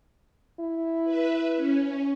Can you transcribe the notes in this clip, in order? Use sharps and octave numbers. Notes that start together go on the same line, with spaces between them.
E4
B4 E5
C#4